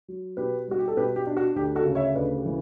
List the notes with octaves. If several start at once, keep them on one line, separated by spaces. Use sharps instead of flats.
F#3
B2 G4 B4
G3 F#4
G4
A4
B2 G4 B4
G4
D4
F#4
D2 G4
F#4 A4
C#3
C#5 E5
D2 B4 D5
G4
E3